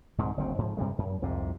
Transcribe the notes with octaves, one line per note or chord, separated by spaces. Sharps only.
C2 G#2 C3 D#3
F#1 D2 C#3 C4
G#2 F3
G2 C3 G3 G#3
F#2
C2 F2 G#2 C3